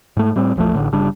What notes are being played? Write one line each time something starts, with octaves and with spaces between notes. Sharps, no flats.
G#2 A3
A2 G3 C4
E1 A#1 F3 A3
A1 A2 D3
G1 C#3 G3 D4